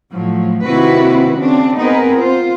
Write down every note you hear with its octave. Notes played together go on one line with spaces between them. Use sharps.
A2 F3 F#3
D#2 C3 C4 E4 F#4 B4
C#3 C4 D4
B3 C4 D#4 G#4 A#4 B4
F4 C5